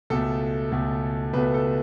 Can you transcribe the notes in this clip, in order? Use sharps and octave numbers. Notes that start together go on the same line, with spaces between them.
C#2 B2 A3 A4
C#2 B2 A3
C#2 B2 A3 B4
A4